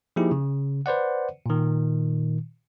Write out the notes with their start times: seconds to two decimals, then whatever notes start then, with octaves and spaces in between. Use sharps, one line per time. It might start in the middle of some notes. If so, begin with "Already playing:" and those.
0.16 F3 A#3 D#4 E4 G4 G#4
0.31 C#3
0.86 B4 C5 D5 F#5
1.46 A#2 D#3